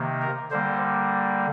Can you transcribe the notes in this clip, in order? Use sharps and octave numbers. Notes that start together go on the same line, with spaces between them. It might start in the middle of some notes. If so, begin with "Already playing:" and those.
Already playing: C3 D#3 A#3
A#4
D3 G3 A#3 C5